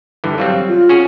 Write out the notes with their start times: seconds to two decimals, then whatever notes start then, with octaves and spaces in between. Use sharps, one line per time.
0.24 G2 D3 E3
0.38 F#3 G3 C4 F5
0.68 F4
0.89 C#4 F#4 G#4